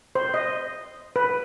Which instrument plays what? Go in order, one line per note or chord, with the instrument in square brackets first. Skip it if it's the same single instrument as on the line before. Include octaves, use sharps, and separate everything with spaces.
[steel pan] C5
D#5
B4